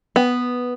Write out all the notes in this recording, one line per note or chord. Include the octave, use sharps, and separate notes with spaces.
B3